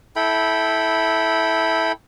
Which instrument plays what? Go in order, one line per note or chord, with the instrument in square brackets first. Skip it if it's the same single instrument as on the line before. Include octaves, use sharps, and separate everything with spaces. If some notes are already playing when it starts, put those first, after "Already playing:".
[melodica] E4 A4 G5 B5